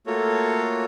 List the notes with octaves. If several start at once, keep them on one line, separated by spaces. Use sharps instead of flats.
A3 A#3 F4 F#4 A4 C#5